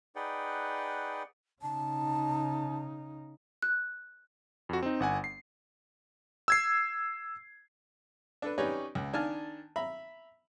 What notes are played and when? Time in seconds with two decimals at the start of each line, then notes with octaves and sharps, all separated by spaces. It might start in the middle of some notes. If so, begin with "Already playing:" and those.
0.16 D#4 G#4 B4 D5 F#5 G5
1.62 C#3 D#4 A5
3.62 F#6
4.69 F2 F#4
4.83 C4 D#4
5.00 G1 F#5 G#5
5.24 C7
6.48 E6 G#6 C7
8.42 D4 A4 B4
8.58 C#4 D#4 G4 B4 C#5 D5
8.95 C#2
9.13 D#3 D4 G#5 A5 F6
9.76 E5 A#5 B5